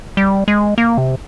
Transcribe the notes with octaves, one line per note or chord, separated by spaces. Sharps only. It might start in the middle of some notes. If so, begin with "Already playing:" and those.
G3
G#3
A#3
C3